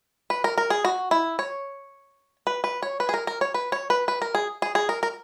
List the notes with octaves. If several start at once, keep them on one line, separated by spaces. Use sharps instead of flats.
B4
A#4
A#4
G#4
F#4
E4
C#5
B4
B4
C#5
B4
G#4
A#4
A#4
C#5
B4
C#5
B4
B4
A#4
G#4
G#4
G#4
A#4
A#4